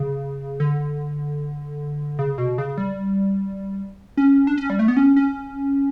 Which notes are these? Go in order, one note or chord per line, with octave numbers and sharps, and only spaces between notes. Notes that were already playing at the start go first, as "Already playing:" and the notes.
Already playing: C#3
D3
C#3
B2
C#3
G3
C#4
D4
C#4
G3
A3
B3
C#4
C#4